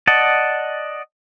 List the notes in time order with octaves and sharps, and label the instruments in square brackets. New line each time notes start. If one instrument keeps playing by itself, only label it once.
[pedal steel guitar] D5 D#5 F#5 A5